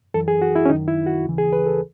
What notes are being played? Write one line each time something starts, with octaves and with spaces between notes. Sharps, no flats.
F#2 E3 A4
G#4
F#4
E4
C#4
F#2 D#3 D#4
E4
F#4
D#2 C#3 E3
G#4
B4
A4